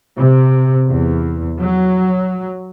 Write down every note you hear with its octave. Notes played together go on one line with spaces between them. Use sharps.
C3
E2
F#3